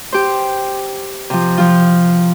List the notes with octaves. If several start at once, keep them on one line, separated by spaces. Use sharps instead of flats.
G4 C5
C3 F3
F3 F4